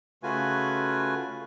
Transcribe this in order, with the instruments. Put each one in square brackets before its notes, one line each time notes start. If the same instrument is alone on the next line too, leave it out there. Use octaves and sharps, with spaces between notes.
[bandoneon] C#3 A3 F4 F#4 B4 G#5